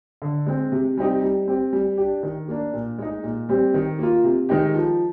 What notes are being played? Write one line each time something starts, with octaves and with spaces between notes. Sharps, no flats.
D3
G#3 C4
C3
G3 C4 D#4 G4
G3
C4 G4
G3
D4 G4
D#3
A#3 D4
A#2
G#3 D#4
A#2
G3 C4 G4
D#3
A#3 F4
C3
D#3 G#3 D#4 G4
F3